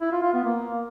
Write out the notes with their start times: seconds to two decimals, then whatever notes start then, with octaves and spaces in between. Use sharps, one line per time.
0.01 E4
0.12 F4
0.23 F4
0.33 B3
0.44 A#3